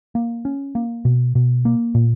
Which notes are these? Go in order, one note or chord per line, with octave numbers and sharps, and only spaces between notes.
A#3
C#4
A#3
B2
B2
A#3
A#2